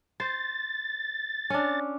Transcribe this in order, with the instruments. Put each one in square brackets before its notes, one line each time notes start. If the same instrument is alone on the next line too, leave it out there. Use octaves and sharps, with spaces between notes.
[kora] C5 [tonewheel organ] A6
[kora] C#4 D4